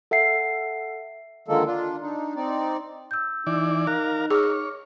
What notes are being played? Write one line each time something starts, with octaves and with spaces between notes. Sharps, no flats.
A4 E5 F#5 C7
D3 D#3 F3 G#3 A#3 A4
D4 F4
D4 D#4
C4 D#4 D5
E6 G6
E3 D#4 D5
A#4 F5 F#6
G#4 C#5 D6 F6